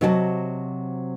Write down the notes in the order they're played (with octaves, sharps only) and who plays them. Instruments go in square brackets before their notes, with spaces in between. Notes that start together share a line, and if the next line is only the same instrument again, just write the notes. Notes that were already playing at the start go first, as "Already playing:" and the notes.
[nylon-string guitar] C3 F#3 F#4 D#5 G5 A5